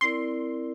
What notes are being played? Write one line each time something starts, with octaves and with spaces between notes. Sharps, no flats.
C4 E4 A#4 D5 C6